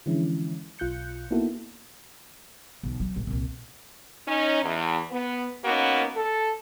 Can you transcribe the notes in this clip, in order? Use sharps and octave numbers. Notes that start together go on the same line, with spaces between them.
D3 E3 F3 G#3 C#4 E4
B1 F4 F#6 G6 C#7
A#3 B3 D#4 E4 F#4 A4
B1
F#3
A#1
C2 A#2
C#4 D#4
E2
B3
A#3 B3 C#4 D#4 F#4
A4